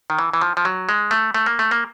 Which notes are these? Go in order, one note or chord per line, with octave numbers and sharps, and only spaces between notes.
D#3
E3
E3
F3
F3
F#3
G#3
A3
A3
A#3
A3
A#3